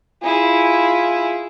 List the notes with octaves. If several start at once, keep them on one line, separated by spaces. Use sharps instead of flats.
E4 F4 G#4